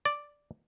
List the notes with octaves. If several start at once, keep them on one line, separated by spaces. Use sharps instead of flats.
D5